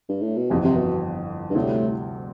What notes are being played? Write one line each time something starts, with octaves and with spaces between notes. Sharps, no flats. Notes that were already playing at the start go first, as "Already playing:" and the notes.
G2
A2
B2
G1 F2 C3 E3
C3
B2
G2
D2 A2 C3 G3